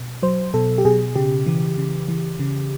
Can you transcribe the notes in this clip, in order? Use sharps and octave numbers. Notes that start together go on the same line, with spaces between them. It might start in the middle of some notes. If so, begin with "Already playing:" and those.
Already playing: B2
F#3 C5
B2 A4
G4
B2 G#4
C#3 G4
E3
C#3
E3
C#3